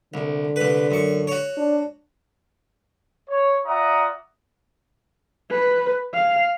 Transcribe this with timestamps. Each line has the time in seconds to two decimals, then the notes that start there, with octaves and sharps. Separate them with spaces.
0.14 C2 D3
0.56 C2 B4
0.91 F#2 C#6
1.27 F#4 C#5
1.57 D4
3.29 C#5
3.66 F4 D5 E5 F#5 A#5 D#6
5.51 B4
6.14 F5